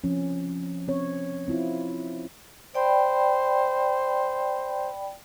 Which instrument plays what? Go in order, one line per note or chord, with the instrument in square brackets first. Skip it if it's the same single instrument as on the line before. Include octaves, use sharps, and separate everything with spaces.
[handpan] F3 C4 C#4
C4 C#4 C#5
C4 E4 F4
[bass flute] C5 [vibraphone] D5 G5 B5